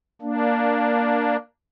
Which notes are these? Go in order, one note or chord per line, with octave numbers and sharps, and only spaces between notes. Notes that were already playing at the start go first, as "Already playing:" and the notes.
A#3 D4